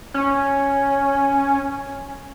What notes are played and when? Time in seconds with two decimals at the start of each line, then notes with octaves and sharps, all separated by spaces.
0.14 C#4